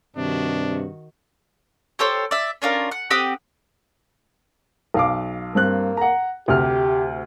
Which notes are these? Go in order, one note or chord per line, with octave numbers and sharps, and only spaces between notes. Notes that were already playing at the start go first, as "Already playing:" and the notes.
G2 C3 D#3 D4 F#4
G4 A4 C5 C#5
D5 E5
C#4 D4 F4 A#4
F#5
C4 G4 F#5 D#6
B1 F5 D6
G2 A#3 C4 F#6
F#5 A#5
D2 C3 G4 F6